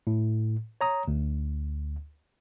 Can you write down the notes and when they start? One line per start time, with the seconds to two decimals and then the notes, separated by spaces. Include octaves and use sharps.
0.07 A2
0.81 C#5 A#5 D#6
1.08 D2